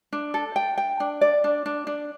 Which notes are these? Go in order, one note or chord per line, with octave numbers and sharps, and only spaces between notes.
D4
A4
G5
G5
D4
D5
D4
D4
D4